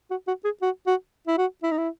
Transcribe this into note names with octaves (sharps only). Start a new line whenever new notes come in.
F#4
F#4
G#4
F#4
F#4
E4
F#4
E4
D#4
E4